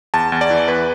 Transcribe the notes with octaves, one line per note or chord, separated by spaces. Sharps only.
E2 A5
E2
D5
E3
E2 B4